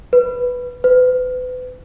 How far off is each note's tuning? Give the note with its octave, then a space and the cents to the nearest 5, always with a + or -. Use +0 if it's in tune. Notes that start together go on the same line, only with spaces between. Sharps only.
B4 +0
B4 +35